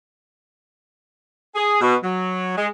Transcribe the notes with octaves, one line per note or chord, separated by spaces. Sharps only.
G#4
B2
F#3
G#3